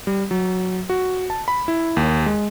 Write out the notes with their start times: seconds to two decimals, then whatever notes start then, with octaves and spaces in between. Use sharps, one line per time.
0.07 G3
0.31 F#3
0.90 F#4
1.30 A5
1.48 B5
1.68 E4
1.97 D#2
2.26 G#3